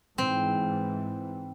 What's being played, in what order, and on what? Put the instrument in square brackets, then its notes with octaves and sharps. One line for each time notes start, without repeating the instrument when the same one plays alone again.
[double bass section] G#2 E3 [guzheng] C4